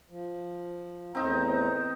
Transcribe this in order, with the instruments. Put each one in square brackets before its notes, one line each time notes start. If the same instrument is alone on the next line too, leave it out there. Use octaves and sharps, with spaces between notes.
[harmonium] F3
[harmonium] E2 A2 A#5 [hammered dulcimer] C4 D#4